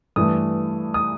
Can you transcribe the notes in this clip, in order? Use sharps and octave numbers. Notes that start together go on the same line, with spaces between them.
G2 E3 A3 D#6
D#6